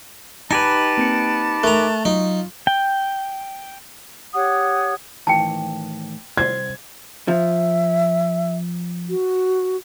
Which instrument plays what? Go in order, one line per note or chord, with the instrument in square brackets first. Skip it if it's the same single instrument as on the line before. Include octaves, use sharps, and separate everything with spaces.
[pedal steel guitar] D#4 G4 B4 [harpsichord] G#5 [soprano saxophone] A5
[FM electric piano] A#3 C4 C#7
[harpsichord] A3 A#5 [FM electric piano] A#4 F#6
[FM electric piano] F#3 [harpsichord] D#4 [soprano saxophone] F4
[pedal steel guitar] G5
[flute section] G4 C#5 F#5 D#6
[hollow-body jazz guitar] A2 D#3 E3 [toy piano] G5 A5
[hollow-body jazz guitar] C2 C5 [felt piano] G#6
[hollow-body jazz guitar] F3 [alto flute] E5
[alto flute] F#4